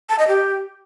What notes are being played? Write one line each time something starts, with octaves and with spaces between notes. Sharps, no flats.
A5
D#5
G4